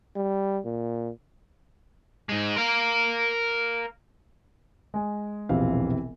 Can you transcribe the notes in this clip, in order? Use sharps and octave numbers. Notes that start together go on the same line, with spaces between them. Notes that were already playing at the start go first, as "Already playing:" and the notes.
G3
A#2
G#2 G#3
A#4 F5
G#3 G#5
E1 A#1 C3 E3 C4 F5